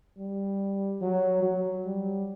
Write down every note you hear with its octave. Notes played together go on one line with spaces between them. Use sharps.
G3
F#3
F#3
G3